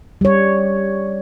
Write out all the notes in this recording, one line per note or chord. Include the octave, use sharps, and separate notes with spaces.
G3 C#5